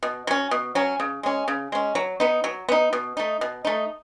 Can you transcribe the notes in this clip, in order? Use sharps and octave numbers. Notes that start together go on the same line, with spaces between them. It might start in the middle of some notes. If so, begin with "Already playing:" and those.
B2
F#3 C#4
B2
F#3 C#4
C#3
G#3 C#4
C#3
G#3 C#4
F#3
B3 D#4
F#3
B3 D#4
B2
A3 D#4
B2
A3 D#4